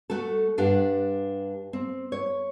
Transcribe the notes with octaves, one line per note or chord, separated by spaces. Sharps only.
A3 F#4 A4
G2 D4 G4 F#5
C4
C#5